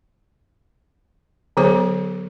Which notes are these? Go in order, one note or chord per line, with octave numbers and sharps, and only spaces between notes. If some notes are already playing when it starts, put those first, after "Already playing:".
D3 F#3 B3 G#4 C5 C#5